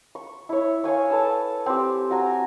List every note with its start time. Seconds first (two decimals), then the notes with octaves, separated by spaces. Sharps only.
0.15 C#6
0.49 E4 C#5
0.84 C#5 F5 G#5 C#6
1.10 A4 B4 A5 E6
1.66 C4 G4
2.11 F#4 G#5 A#5